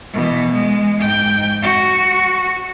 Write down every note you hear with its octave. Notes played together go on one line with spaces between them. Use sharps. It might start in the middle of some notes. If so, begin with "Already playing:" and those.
B2 E3
G#3
G#2 G5
F#4